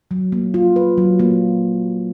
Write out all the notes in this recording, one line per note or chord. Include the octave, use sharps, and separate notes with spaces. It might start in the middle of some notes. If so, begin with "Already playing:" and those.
F#3
A#3
F4
B4
F#3
A#3